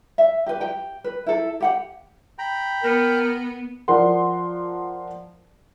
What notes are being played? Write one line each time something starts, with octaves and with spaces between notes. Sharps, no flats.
E5
G4 B4
G4 G5
B4
E4 A4
G4 F#5 G5
G5 A#5 B5
B3 A#4
F3 A#4 D5 F#5 C6